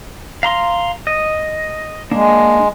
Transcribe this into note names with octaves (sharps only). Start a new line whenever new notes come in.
F5 A#5 C6
D#5
G#3 A#3 D4